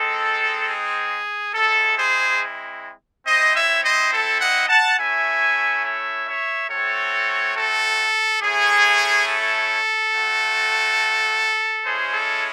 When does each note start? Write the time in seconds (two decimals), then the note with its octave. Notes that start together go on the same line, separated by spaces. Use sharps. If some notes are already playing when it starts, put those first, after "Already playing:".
Already playing: G#3 C4 D#4 A4
0.68 G#4
1.54 G#3 C4 E4 A4
1.98 G#4 C5
3.26 C4 E4 C5 D#5
3.55 C#5 E5
3.84 C5 D#5
4.13 A4
4.41 D#5 F#5
4.69 F#5 A5
4.98 A3 C#4 E4 E5 G#5
5.84 C#5 E5
6.28 C#5 E5
6.70 A3 C4 F#4 A4 C#5
7.57 A4
8.43 A3 C#4 E4 G#4
9.27 A4
10.14 A3 C4 F#4
11.85 G#3 C#4 E4 G#4 C5
12.14 A4